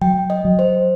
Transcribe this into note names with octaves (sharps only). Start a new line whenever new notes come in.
F#3 G5
D#5
F#3
C5